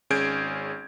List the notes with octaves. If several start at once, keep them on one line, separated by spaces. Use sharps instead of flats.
G#1 C#4 G#4 G6 G#6 D7